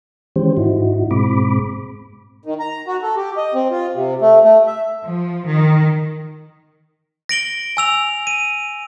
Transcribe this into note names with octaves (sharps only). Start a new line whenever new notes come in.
D#3 E3 G#3 C#4 G4 C5
G#2 D#4 E4 F#4
G#2 B2 G#3 C4 B5 D6
D#3
A#5
F#4
A4
G4
D#5
C4
F4
C3
A3
A3
E5
F3
D#3
A#6 D7 F#7 G7
G#5 E6 F7
D#7